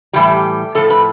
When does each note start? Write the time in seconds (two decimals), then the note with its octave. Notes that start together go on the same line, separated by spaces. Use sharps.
0.13 A2 E3 G3 G4
0.75 A2 F3 A4
0.90 B4